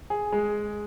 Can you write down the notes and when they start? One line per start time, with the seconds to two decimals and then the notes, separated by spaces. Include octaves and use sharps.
0.10 G#4
0.32 G#3